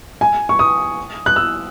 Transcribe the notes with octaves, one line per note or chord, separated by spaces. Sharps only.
G#5
C#6
D#6
F#6
E6